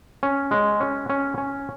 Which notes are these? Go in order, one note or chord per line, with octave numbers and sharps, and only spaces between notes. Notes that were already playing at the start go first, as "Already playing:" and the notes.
C#4
G#3
C#4
C#4
C#4